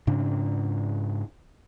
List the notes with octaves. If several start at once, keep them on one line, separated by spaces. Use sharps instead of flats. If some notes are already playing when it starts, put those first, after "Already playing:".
G#2 C#3 D4